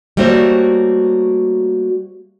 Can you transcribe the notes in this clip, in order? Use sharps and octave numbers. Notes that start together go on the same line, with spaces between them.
G3 A3 A#3 F#4 C5 C#5